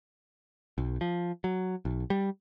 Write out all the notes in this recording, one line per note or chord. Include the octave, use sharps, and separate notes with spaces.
B1
F3
F#3
B1
G3